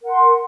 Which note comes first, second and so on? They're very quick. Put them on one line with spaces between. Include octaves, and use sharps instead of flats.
A#4 F#5 C6